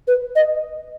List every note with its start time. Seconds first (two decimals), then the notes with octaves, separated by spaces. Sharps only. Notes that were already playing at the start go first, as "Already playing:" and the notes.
0.07 B4
0.36 D#5